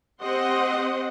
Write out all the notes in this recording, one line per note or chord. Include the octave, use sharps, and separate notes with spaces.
C4 G4 C5 D#5 F#5 C6